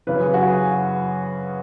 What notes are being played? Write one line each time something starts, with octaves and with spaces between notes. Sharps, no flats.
F#2 C#3 E3 B4
G#4
F#4
G#4